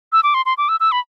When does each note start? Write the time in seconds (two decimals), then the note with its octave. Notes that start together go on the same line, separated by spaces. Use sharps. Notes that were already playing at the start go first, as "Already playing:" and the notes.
0.13 E6
0.23 D6
0.34 C6
0.46 C6
0.58 D6
0.69 E6
0.80 E6
0.92 B5